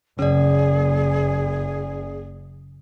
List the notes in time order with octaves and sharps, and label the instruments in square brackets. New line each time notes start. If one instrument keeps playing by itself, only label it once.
[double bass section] F#1 [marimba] C#3 [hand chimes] C#4 D5 [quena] G#4